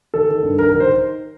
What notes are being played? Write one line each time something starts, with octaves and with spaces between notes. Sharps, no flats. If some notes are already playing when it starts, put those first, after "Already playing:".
D#3 A4
D#3
G2
D#3 A#4
D#3 A#4
C5